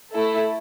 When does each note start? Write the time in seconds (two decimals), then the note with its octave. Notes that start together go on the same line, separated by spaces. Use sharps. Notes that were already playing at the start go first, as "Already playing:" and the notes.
0.12 A3 E4 A4